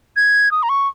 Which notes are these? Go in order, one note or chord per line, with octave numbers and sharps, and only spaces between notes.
G#6
D#6
A#5
C#6